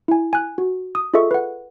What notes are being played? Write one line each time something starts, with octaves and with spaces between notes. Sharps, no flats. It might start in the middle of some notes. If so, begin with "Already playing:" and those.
E4 G#5
G#5 F#6
F#4
D#6
F4 G#4 A4 D#5 E5 C#6
B4 F#5